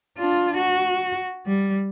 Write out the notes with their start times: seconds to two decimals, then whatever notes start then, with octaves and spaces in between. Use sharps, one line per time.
0.18 D4 F4
0.57 F#4
1.46 G3